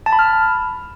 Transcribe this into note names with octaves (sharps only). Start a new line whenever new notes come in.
A5
B5
F6